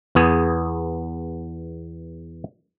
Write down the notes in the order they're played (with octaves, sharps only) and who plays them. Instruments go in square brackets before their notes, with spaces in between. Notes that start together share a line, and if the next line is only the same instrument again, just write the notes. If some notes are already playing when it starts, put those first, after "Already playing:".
[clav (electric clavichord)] E2 B3 G#4